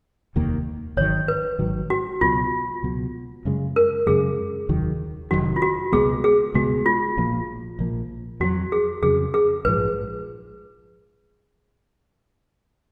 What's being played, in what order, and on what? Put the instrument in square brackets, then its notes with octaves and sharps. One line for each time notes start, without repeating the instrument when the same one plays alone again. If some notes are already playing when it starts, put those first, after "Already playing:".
[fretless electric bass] F1 D#2 D#3 A#3
[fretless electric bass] G#1 G#2 D#3 F#3 [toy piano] C#5
[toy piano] B4
[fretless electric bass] G#1 G#2 D#3 F#3
[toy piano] F#4
[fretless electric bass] C#2 B2 F#3 [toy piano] F4
[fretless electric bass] C#2 B2 F#3
F#2 C#3 G#3
[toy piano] A#4
[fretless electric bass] F#2 C#3 G#3 [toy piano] G#4
[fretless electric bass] F1 D#2 D#3 F#3
[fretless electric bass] F1 D#2 D#3 F#3 [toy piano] F#4
[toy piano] F4
F#4
[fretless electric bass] C#2 B2 G#3 B3 [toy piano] G#4
[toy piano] G#4
[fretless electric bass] C#2 B2 G#3 B3 [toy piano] F#4
[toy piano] F4
[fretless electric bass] A#1 A#2 F3 A#3
A#1 A#2 F3 A#3
[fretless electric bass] F2 C#3 F#3 [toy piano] F#4
[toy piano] G#4
[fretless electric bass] F2 C#3 F#3 [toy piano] G#4
[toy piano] G#4
[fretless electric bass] A#1 G#2 F3 [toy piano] B4